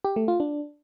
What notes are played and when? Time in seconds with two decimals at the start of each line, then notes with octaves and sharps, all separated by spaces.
0.05 G4
0.16 A3
0.28 F4
0.40 D4